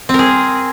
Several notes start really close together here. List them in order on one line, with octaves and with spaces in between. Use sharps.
C4 A#4 G#4